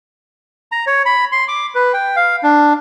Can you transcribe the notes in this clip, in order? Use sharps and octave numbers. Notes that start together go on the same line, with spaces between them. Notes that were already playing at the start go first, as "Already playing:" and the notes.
A#5
C#5
B5
C6
D6
B4
G5
F5
D4